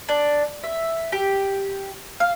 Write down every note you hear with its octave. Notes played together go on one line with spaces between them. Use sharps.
D4
E5
G4
F5